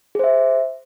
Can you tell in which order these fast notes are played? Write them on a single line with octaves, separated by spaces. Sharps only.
G#4 C5 E5